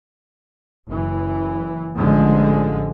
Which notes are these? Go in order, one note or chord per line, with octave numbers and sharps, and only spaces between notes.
F#1 E3
A1 D3 F3 G#3